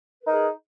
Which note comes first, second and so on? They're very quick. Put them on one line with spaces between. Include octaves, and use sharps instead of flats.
B4 A#4 D#4 G#4